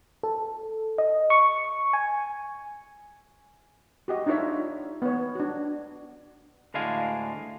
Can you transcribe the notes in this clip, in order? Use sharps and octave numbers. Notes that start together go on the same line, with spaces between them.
A4
D#5
C#6
G#5
F#4 G4 D#5
D4 D#4 F4 C#5 E5
B3 C#5
D4 F#4
D2 A2 G#3 D4 F5 G#5